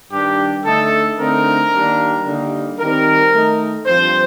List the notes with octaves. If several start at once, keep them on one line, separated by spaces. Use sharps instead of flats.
G2 D#3 G3 D4 G4
D3 A3 D#4 A4
D3 A3 C4 D#4 A#4
D#3 G3 A#3 D4
D3 G3 A#3 D#4
D#3 G3 C4 A#4
D#3 A3 D#4
G2 F3 C4 C5